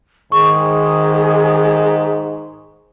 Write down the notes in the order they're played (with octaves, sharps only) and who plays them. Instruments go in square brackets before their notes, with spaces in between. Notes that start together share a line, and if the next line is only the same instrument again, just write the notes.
[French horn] G#2 [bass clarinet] D#3 [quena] G#4 [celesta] C#6